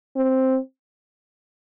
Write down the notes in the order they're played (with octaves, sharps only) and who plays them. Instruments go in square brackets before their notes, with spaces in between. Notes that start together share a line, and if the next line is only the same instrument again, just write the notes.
[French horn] C4